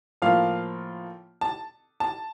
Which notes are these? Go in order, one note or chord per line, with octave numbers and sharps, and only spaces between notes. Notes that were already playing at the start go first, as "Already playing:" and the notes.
A2 F3 A#3 F4 F5
A5
A5